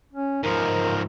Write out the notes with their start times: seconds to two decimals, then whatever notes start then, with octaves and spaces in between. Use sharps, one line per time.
0.13 C#4
0.43 G#2 F3 A#4